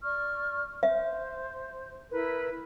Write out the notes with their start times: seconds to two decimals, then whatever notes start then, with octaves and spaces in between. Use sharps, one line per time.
0.03 D5 C#6 F6
0.83 C5 E5
2.11 E4 A#4 B4